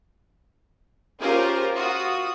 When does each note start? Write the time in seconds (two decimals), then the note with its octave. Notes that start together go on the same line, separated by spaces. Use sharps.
1.19 C#4 F4 G4 G#4 A#4 C5
1.76 F4 F#4 D#6